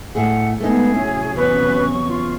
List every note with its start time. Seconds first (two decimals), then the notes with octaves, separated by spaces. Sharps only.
0.15 A2 A3 G#4 F#5
0.60 G#3 A3 B3 D#4 G#4
0.95 C3 F#3 C#4 E4
1.36 E2 B4 C#6
2.08 F4